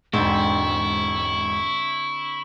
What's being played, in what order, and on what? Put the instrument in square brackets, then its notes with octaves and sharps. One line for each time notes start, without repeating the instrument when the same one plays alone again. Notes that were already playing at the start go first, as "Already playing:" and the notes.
[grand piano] E1 G#2 [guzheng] D3 C4 [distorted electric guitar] E4 [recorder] C#6